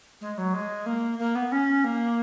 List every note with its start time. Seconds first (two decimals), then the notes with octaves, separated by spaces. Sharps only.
0.21 G#3
0.38 F#3
0.54 G#3
0.86 A#3
1.19 A#3
1.35 B3
1.52 C#4
1.84 A#3